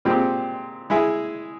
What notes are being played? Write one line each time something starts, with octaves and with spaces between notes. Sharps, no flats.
A#2 G#3 C4 G4
G#3 E4 G#4